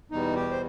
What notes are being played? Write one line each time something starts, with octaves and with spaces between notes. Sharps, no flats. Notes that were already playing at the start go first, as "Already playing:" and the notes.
E2 B2 G3 D#4
G4
C5